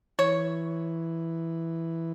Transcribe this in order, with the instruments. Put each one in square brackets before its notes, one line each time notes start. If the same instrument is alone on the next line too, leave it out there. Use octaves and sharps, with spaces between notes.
[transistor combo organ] E3 [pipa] C#5